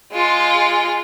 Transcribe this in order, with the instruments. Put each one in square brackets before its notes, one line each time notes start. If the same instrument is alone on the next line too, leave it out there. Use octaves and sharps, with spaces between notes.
[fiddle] G#3 F4